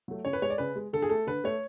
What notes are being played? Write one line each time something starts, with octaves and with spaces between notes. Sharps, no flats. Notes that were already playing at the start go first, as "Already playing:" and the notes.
F#3 A3
C#3 C#5
B4
G#3 C#5
D5
C#3 B4
G#3
D3 A4
G#4
A3 A4
D3 B4
A3 C#5